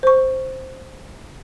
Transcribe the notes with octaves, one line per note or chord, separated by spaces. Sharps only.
C5 C#6